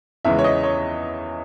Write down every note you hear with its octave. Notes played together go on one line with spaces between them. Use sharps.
E2 C#3 E3 G#3 E5
C#5
D#5
C#5